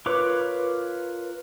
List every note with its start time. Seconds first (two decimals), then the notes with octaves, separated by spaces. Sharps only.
0.06 F4 A#4 B4 C#5 D6